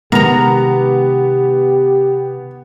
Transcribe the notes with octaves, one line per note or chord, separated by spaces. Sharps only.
C3 D#3 G#3 B3 G4 A#4 A#5